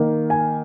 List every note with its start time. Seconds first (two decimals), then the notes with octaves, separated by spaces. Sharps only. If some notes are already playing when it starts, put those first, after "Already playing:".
Already playing: D#3 A#3
0.30 G#5